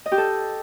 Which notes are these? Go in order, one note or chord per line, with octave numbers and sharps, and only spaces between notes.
D#5
G4
A4